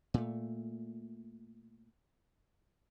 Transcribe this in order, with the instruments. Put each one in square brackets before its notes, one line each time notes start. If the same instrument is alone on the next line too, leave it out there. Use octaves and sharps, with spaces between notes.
[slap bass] A#2 A3